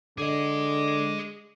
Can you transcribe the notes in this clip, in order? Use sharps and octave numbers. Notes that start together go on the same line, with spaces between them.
D3 G#4 D#5 D6